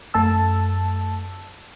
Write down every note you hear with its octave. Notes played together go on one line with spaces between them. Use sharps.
F#2 A3 A5 E6